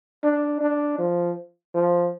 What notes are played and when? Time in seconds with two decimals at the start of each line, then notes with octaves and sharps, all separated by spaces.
0.23 D4
0.61 D4
0.98 F3
1.74 F3